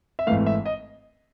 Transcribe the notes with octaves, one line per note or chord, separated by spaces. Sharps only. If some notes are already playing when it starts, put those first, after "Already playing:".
E5
G#1 G#2 E3 A3 F5
E5
D#5